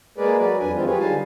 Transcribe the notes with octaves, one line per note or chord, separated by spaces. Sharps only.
G#3 A#3 G#4 A#4 B4 D5
F#3 F#4 A#4 B4 D5
F2 D4 B4 G#5
D#3 F3 G#3 C4 F4
F#3 F4 G4 G#4 B4 C#5
D3 G3 D#4 F5 G#5 A5